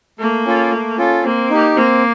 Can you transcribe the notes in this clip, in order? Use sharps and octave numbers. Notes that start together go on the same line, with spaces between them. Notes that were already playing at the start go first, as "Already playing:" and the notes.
A3 A#3
C#4 F4 A4
A3
C#4 F4 A4
A#3 C4
D#4 G4
A#3 C4